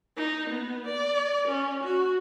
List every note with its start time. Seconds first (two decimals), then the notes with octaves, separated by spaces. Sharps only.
0.17 D#4
0.50 B3
0.86 D5
1.48 C#4
1.83 F#4